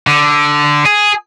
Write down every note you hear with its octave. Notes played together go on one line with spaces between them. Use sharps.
D3
G#4